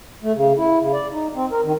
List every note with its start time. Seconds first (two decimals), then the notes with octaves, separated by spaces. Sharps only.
0.23 A3
0.36 C#3
0.58 E4
0.81 C#3
0.93 D5
1.12 D#4
1.35 C4
1.52 A#4
1.64 D#3